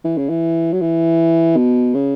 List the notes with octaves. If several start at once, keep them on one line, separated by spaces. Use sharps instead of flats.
E3
C#3
E3
F#3
E3
B2
C#3